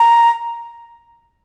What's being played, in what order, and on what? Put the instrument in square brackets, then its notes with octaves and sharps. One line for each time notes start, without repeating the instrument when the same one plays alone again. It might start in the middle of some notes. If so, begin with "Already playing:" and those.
Already playing: [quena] A#5